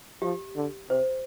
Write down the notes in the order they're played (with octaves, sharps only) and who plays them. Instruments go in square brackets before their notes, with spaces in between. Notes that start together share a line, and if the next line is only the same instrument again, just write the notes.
[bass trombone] F3 [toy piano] G4
[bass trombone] D3
[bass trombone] C3 [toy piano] C5